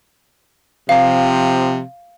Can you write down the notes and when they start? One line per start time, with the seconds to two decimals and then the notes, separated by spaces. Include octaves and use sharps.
0.89 C3 F3 F5